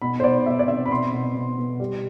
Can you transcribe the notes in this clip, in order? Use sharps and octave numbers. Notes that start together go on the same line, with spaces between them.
B2 B5
C5
B2 D5
B2 E5
D5
C4 E5
B5
B2 C6
B2
B2
B3
G3